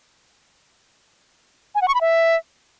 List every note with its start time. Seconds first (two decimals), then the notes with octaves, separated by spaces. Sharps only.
1.75 G#5
1.81 F#5
1.88 C#6
1.94 B5
2.01 E5